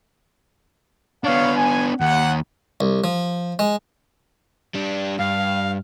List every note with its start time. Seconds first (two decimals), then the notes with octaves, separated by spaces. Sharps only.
1.24 B3 D4 C#5 F5
1.57 G#5
2.01 D#2 F#5
2.81 C2
3.04 F3
3.59 G#3
4.74 G3 D4
5.19 G2 F5